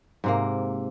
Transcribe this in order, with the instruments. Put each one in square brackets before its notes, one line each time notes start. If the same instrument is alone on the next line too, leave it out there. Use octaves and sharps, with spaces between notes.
[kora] G#2 C3 A#3